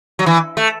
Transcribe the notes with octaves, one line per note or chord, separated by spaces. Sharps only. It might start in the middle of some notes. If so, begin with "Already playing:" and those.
F#3
E3
A3